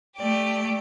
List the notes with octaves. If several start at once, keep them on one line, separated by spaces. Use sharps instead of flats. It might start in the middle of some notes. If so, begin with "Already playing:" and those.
A3 G4 D5